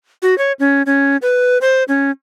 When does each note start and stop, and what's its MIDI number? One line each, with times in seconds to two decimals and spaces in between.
0.22 0.37 66
0.38 0.52 73
0.59 0.82 61
0.86 1.17 61
1.22 1.58 71
1.61 1.84 72
1.88 2.11 61